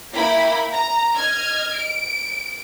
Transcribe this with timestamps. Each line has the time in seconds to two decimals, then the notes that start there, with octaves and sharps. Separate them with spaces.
0.13 A#3 E4 G5 B5
0.73 A#5
1.16 D#5 F6 G#6
1.77 D7